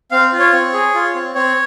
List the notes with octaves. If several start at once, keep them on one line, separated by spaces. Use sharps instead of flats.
C4 F5
F4
C#5
C4
G#4
F4
C4
C4 C#5